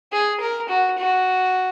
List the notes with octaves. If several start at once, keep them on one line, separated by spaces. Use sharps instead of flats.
G#4
A#4
F#4
F#4